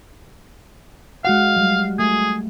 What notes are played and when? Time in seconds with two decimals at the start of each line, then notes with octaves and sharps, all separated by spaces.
1.25 G#3 F#4 F5 F#5
1.56 F#3 G3
1.99 A3 G#4